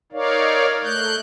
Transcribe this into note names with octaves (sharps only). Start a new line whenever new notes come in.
D#4 A#4 C#5 D5 F5
A3 F#6 G6